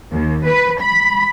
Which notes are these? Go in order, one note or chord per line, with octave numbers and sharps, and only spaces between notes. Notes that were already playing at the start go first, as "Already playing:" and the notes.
D#2
B4
B5